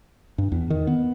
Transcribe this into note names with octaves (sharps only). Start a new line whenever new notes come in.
G2
E2
D#3
B3